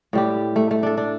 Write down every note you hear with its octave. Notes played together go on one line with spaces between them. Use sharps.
A2 G3 G4
A3
A3
D4 A4
D4